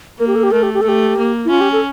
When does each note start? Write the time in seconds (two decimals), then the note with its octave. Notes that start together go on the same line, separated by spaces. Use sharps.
0.19 A#3 A#4
0.27 G4
0.35 A4
0.43 G4
0.52 A3 A#4
0.63 G4
0.74 G4
0.81 A4
0.85 A3 G4
1.17 A#3
1.45 E4
1.50 C#4 F4
1.61 G4
1.72 A4